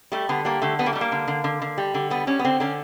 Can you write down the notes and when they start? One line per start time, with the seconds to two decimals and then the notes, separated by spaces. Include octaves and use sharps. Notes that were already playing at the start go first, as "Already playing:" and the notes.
0.12 G3 A3
0.29 D3 B3
0.45 G3 A#3
0.62 D3 A3
0.79 G3 B3
0.86 A#3
0.93 A3
0.95 G3
1.01 A#3
1.12 D3
1.28 D3
1.44 D3
1.62 D3
1.78 G3
1.94 D3
2.10 G3 B3
2.27 G3 C#4
2.39 B3
2.45 D3 C4
2.60 D3 C#4